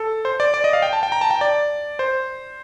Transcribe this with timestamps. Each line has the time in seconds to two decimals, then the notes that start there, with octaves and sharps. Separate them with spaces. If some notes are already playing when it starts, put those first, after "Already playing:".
Already playing: A4
0.25 C5
0.40 D5
0.54 D5
0.64 D#5
0.73 F5
0.82 G5
0.93 A5
1.03 G5
1.12 A#5
1.21 A5
1.31 G5
1.41 D5
1.99 C5